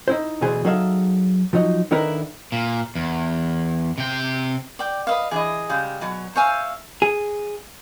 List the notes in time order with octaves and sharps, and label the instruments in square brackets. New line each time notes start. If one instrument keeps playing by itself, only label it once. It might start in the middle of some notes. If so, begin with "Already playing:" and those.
[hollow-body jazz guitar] D#4 E4 C5
D2 B2 E3 G#4 C5
F#3 D#4 G#4 A4 E5 F5
F3 F#3 D#4
D3 D#3 D#4 E4 A#4 B4
[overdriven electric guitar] A#2
E2
C3 G5
[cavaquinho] D5 G5
B4 D#5 F5
[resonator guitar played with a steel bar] E3 D4 D#5 [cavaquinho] G#4
[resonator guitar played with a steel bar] C#3 G3 G#3
B2 F#3
[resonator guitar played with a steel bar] C5 G#5 [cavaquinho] C#5 E5 F5
[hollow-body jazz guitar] G#4